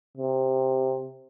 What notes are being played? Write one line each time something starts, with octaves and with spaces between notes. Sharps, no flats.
C3